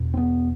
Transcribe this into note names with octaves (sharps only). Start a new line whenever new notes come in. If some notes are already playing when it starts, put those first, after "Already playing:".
Already playing: E2 B2
C4
B3